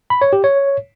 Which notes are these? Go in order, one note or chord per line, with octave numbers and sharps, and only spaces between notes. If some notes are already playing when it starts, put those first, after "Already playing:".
B5
C#5
G4
C#5